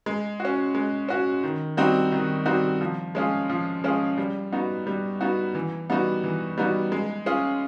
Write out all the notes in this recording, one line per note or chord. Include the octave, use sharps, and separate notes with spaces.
G#3
C#4 F#4
G#3
C#4 F#4
D#3
G3 C4 D#4 F#4
D#3
G3 C4 D#4 F#4
F3
G#3 C#4 F4 G#4
F3
G#3 C#4 F4 G#4
G3
B3 D#4 F#4
G3
B3 D#4 F#4
E3
G3 B3 D#4 F#4
E3
G3 B3 D#4 F#4
G#3
C#4 F4 G#4